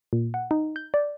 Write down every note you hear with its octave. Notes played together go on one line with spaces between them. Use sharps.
A#2
F#5
D#4
G6
D5